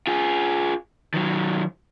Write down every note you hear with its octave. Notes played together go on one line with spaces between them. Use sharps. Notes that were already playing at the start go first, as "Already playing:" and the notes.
F4 G#4
D#3 F#3